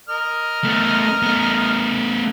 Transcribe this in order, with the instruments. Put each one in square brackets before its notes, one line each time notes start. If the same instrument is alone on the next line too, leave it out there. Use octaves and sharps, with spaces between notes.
[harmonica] A#4 D#5 F6
[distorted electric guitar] A3 B3
A3 B3